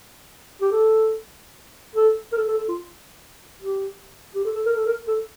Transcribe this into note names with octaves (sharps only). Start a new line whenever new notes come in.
G4
A4
A4
A#4
A4
A4
A4
F4
G4
G4
A4
A4
A#4
A4
A#4
A4